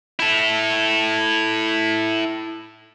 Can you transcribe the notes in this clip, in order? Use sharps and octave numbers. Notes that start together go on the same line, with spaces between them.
E4 A4